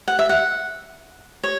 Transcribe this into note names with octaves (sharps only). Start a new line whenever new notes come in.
F#5
E5
F#5
C#5